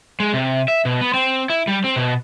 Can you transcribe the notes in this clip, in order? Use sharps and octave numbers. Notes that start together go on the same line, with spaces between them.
G#3
C3
E5
B2
B3
C4
E4
G3
C4
B2